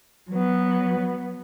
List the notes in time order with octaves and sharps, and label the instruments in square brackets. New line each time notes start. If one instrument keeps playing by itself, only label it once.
[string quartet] F#3 B3